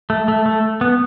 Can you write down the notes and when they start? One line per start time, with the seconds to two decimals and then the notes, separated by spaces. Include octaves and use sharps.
0.10 A3
0.28 A3
0.46 A3
0.81 B3